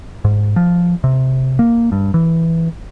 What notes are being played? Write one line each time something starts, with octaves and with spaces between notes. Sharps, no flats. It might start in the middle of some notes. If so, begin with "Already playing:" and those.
G#2
F3
C3
A#3
G2
E3